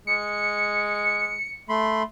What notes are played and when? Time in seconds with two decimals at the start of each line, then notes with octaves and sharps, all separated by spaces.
0.07 G#3 C#7
1.69 A3 B5 C6